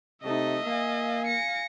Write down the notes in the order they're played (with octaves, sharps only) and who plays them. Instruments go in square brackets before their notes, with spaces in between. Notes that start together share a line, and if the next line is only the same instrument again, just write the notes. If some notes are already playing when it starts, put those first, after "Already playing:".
[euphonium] C3 [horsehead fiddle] A3 D#4 [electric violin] D#5 E5
[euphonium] A#3 [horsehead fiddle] F5 G#5
[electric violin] A#6 C#7